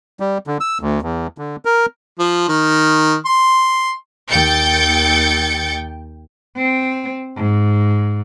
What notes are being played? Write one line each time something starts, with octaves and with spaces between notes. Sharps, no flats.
G3
D3
E6
D2
E2
D3
A#4
F3
D#3
C6
D#2 G5 G6 A6 C#7
C4
G#2